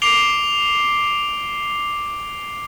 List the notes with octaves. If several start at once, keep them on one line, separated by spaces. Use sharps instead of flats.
D6 C7 D7 F7 G7